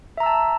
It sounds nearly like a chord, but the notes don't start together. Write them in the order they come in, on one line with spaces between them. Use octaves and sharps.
E5 A#5 E6 A5